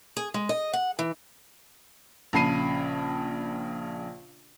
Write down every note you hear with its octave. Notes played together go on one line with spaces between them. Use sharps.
G#4
G#3
D#5
F#5
E3
A#1 C#3 A5 B5 C7 D#7